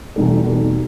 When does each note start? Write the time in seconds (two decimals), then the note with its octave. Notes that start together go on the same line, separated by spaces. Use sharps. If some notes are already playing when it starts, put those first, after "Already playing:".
0.16 E2 B2 G3 D#4 A4
0.44 E2 B2 G3 D#4 A4